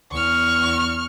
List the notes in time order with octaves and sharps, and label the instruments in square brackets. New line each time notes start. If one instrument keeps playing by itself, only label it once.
[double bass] E2 [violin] C#6 F6